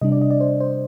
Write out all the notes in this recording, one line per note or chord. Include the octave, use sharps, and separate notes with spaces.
C3 G3 D4 D#5
D5
D#5
D5
C5
C5